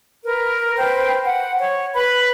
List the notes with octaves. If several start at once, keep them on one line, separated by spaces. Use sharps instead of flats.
A#4 B4
B4 C5 G5
F#5
C#5
B4 B5